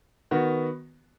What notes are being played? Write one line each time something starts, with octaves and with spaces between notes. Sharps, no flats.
D#3 B3 F#4